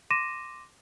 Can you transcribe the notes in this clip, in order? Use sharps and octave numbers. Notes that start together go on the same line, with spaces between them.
C6 D6 A#6 D#7 E7